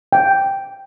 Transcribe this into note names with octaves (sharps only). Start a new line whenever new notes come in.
G5